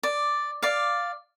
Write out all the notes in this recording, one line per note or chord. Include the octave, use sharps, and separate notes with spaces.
D5
D5 F5